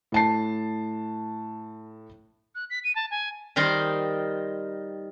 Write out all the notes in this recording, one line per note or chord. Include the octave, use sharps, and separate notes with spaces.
A2 A5 C7
F#6
B6
D#7
A5
G#5
D#3 G3 D#4 A#4 C5